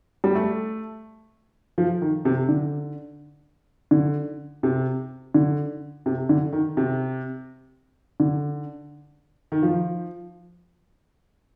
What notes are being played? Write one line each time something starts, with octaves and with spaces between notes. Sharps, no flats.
G3
A3
F3
D#3
C3
D3
D3
C3
D3
C3
D3
D#3
C3
D3
D#3
F3